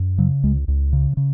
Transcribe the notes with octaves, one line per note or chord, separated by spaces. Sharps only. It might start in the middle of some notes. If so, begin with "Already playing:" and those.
Already playing: F#2
C#3 F#3
C#2 G#3
C#2
C#3
C#3